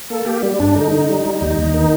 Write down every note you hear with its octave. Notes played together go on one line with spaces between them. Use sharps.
A#3 A4
A#3 G4
G3
G2 D4
D3 D#4
D3 D#4
G3 D#4
G3
D#4
D#2
D#2
D#3